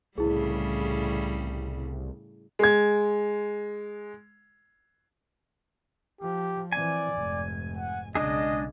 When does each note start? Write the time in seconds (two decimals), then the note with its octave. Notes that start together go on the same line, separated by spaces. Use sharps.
0.18 C2 A2 C#3 G3 E4 G#4
2.59 G#3 G#6
6.21 F3 G4
6.72 E3 C4 D5 G#5
7.15 F1 G#2
7.77 F#5
8.15 B1 C#3 G#3 D4 G#4 D#5